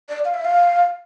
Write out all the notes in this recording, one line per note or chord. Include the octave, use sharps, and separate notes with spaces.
D5
F5
E5
F5